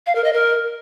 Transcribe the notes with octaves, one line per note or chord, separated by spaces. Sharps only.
F5
A#4
D#5
A#4